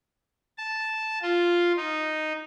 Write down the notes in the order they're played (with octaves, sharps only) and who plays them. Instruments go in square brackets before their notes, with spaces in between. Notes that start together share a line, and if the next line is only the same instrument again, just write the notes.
[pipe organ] A5
F4
D#4